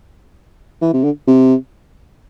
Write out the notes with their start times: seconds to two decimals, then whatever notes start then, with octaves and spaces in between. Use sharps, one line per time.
0.81 E3
0.93 C3
1.04 D3
1.27 C3